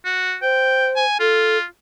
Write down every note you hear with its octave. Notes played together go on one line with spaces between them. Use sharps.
F#4
C5 G5
G#5
F4 A4